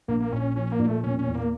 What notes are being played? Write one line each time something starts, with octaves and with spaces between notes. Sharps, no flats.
A#1 A#3
A#3
A#2 C#4
F3 C#4
A#3
A#2
A3
E1 C#4
C#4
E2
A#3